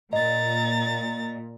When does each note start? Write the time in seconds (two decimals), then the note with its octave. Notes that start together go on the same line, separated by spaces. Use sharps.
0.13 A#2 D#5 A#5 A6